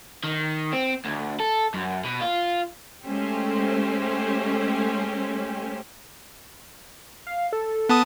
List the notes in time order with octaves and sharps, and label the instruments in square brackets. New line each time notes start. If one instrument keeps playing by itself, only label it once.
[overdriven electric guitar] D#3
C4
D2
A4
F#2
B2
F4
[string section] G#3 A3 C#4 G4 C5
[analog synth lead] F5
A4
[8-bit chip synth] B3 A5 D#6